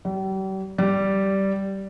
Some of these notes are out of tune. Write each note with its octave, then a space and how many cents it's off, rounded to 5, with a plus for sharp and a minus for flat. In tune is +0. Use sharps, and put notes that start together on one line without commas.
G3 -40
G3 -10